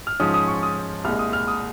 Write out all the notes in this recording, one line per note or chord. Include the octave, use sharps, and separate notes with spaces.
F6
G#2 F3 G#3 C#4 D#6
D#6
C#6
D#6
C2 A#2 G#3 F6
D#6
F6
D#6